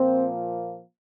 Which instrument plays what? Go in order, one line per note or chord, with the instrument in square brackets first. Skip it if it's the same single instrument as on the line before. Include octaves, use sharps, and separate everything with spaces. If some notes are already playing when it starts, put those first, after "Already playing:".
Already playing: [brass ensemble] A#2 F3 A#3 C4